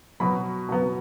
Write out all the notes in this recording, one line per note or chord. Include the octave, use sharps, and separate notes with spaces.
B2 F#3 B3 B5
B2 F#3 B3